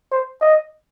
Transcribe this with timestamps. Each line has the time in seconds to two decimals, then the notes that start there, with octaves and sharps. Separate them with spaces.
0.11 C5
0.41 D#5